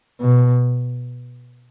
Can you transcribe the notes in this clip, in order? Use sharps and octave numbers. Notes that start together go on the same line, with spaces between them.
B2